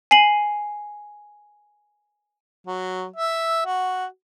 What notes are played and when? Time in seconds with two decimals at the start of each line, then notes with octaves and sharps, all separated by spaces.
0.11 G#5 C7 D#7 F#7
2.67 F#3
3.16 E5
3.66 F#4